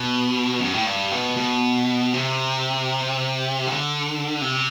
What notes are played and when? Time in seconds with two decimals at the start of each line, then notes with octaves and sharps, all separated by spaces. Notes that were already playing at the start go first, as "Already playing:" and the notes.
Already playing: B2
0.60 F#2
0.74 A2
0.86 G2
1.12 B2
1.37 B2
2.13 C3
3.66 D3
4.42 C3